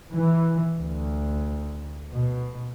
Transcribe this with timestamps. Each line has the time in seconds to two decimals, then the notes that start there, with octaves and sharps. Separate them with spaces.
0.13 E3
0.75 D2
2.12 B2